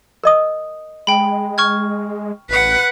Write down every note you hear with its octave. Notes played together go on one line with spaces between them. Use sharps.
A#4 D#5 D#6
G#3 G5 B5
C#6 F6 G#6
A1 B4 F#5